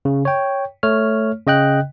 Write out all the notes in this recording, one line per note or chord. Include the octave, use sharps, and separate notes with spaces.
C#3
C#5 G5
A3 C#5 F6
C#3 D#5 G5 F#6